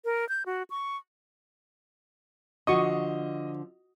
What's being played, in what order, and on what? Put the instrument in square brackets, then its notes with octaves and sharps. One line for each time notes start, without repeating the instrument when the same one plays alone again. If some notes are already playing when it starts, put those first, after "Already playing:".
[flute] A#4
G6
F#4
C#6
[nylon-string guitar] D3 F3 [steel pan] F#4 C#6 D#6 [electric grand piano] D#5